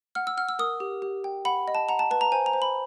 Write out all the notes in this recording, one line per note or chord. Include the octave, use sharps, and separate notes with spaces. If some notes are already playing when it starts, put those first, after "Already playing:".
F#5 F6
E6
F#5 F6
E6
A#4 D#6
G4
G4
G5
F#5 B5
D#5
A5
F#5 A#5
A5
B4 A5
A#5
C5 G#5
A#5
C5
B5